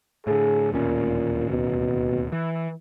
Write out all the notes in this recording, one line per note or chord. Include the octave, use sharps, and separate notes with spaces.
A2 D3 G#4
D1 D#2 A#2 C#4
B2
E3